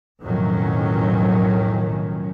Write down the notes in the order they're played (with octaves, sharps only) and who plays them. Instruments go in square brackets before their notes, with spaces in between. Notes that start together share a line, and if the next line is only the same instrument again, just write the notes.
[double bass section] B1 F2 A2 D#3 F#3 C#4